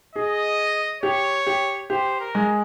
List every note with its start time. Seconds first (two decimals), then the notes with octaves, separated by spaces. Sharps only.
0.15 G#4 D#5
1.03 G4 C#5
1.47 G4
1.90 G4 C5
2.20 A#4
2.35 G#3